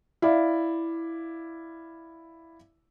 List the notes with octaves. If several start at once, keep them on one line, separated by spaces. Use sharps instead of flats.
E4 D5 F5